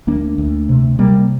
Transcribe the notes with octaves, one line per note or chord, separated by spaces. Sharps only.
D2 A#3 D4
D2
C3
C3 G3 A#3